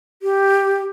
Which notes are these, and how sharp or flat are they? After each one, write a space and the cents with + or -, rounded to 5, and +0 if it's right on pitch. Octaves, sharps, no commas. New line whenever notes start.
G4 +0